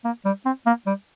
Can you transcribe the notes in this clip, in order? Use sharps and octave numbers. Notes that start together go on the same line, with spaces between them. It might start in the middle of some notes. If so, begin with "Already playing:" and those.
A#3
G3
C4
A#3
G3